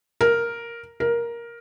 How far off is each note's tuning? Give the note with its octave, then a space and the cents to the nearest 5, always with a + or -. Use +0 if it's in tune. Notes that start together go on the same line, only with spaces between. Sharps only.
A#4 +0
A#4 +10